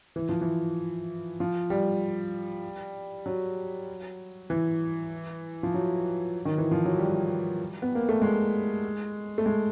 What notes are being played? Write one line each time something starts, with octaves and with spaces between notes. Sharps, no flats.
E3
F3
E3
F3
G3
F#3
E3
F3
F#3
D#3
E3
F3
F#3
G3
B3
A#3
A3
G#3
A3
G#3